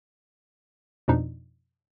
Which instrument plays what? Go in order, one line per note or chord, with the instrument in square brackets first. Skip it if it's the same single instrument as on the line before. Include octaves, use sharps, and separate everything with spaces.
[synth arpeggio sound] F2 B2 F3 D4 D#4